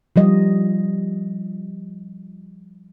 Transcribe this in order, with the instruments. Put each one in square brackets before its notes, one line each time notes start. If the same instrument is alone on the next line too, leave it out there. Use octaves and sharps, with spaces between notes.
[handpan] F3 G3 D#5